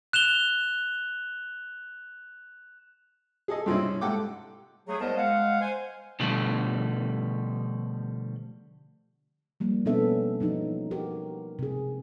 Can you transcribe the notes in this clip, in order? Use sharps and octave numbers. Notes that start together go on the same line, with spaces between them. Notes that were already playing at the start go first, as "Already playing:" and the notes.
F#6 E7 F7 G7
G#4 A4 D#5
G2 C3 C4 C#4 D#4 E4
G#2 G4 A4 F#5 G5 D6
F#3 A3 G#4
C2 B3 A#4 C5 D#5 A5
G#3 F5 F#5
C5 G#5
B2 D3 F3 G3 A3
F3 G3 A#3
B2 B3 C#4 D4 A4 E5
F3 F#3 D#4
D#4 F#4 G4 A#4
C3 G#4